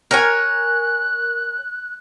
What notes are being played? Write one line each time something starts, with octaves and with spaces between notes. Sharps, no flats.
A#4 C#5 G#5 F#6